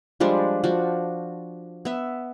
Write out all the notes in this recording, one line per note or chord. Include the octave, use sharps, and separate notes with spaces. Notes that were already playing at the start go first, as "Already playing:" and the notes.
F3 G3 G#3 D4
F3 D4 F#4
B3 E5